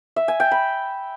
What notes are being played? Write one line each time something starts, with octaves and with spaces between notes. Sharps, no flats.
E5
G#5
G5
B5